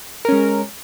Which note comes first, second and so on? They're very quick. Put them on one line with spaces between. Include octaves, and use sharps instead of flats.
A#4 C#4 G#3